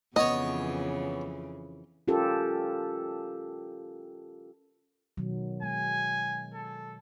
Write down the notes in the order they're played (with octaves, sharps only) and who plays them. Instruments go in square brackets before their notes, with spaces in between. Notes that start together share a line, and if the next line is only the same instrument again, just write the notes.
[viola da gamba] F2 C#3 E3 [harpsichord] B3 C#5 [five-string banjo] D#5
[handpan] C#4 F4 G4 A4 A#4
B2 D#3 F#3
[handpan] G#3 [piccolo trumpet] G#5
[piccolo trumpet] A4